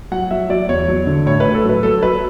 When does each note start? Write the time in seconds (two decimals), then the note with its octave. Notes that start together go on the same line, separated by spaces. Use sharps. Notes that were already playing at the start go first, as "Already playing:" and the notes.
0.12 F#3 F#5
0.31 F#3 E5
0.50 F#3 D5
0.69 E2 C#5
0.88 F#3
1.07 D3
1.26 A2 C#5
1.40 B4
1.46 A2
1.54 A4
1.64 F#3 B4
1.83 F#3 A4
2.02 F#3 B4